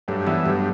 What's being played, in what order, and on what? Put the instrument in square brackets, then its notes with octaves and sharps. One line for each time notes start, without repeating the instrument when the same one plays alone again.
[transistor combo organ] G2 [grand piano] F#3 A3
[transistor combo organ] E3 [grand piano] G3 B3
[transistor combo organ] G2 [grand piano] F#3 A3